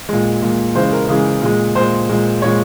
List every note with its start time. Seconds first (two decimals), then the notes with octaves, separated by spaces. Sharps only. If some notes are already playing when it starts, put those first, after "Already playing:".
0.09 A#2 G#3
0.42 A#2 G#3
0.75 C#3 E3 G#3 C5
0.92 A#4
1.09 C#3 E3 G#3 G#4
1.42 A#2 G#3
1.75 A#2 G#3 C5
2.09 A#2 G#3
2.42 A#2 G#3 C#5